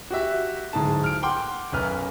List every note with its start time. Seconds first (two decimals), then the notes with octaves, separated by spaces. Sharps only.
0.10 F#4 G4 E5
0.73 D1 G#2 G#4 A5
1.04 F6 D7
1.23 F#5 G5 C6 D6
1.72 B1 F#2 B4 F6